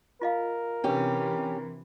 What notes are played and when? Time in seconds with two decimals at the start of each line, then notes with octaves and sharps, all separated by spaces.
0.22 F4 A#4 D#5 F5
0.84 C3 E3 C#4 D4 G4 B4